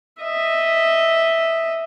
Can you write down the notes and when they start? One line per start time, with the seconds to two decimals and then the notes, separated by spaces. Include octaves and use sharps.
0.21 D#5 E5